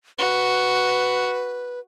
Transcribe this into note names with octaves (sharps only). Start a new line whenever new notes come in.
F#4 B4